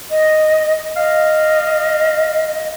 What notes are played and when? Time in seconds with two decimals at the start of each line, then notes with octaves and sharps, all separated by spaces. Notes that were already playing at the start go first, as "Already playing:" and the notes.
0.11 D#5
0.96 D#5 F5